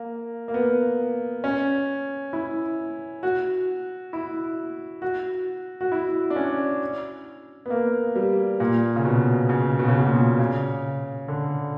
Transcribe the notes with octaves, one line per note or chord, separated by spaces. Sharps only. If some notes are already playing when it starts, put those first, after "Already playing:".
Already playing: A#3
A#3
B3
C#4
E4
F#4
E4
F#4
F#4
E4
D4
C#4
B3
A#3
G3
A#2
C#3
B2
C#3
B2
C#3
B2
A#2
B2
C#3
D3